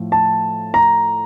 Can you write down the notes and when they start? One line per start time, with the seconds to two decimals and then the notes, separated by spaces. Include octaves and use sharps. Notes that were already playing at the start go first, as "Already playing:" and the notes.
Already playing: A2 F3
0.12 A5
0.74 A#5